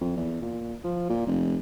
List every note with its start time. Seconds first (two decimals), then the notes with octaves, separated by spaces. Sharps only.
0.01 F2
0.16 E2
0.42 A#2
0.84 F3
1.09 A#2
1.27 F1